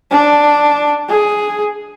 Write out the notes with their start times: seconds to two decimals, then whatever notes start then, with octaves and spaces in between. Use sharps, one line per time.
0.11 D4
1.09 G#4